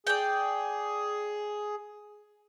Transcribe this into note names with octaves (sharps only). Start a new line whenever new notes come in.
G#4 D5 G5